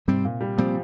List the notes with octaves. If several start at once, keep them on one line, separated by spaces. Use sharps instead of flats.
G#2 C3 G3 C4
A#2
G3
A#2 F3 G3 C4